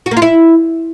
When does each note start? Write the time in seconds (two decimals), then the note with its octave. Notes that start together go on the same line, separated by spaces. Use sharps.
0.06 F#4
0.11 A#3
0.17 F4
0.22 E4